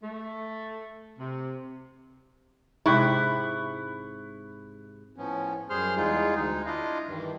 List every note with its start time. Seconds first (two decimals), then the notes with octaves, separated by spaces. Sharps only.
0.04 A3
1.19 C3
2.86 G#2 C3 E4 G5 B5 C#6 F#6
5.16 A2 F3 B3 C#4
5.70 F#2 G3 G#4 C5 C6 F6
5.97 E2 G3 G#3 D#4 F4 G#4
6.35 D2 G#3 D#4
6.66 D4 E4 F4 D#5 F5
7.08 G2 D#3 E3 G3